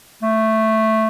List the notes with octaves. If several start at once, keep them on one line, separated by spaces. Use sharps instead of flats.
A3